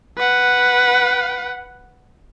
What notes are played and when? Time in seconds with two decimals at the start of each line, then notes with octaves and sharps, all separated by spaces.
0.18 B4 F#5